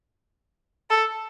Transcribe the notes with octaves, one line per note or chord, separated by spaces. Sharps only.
A4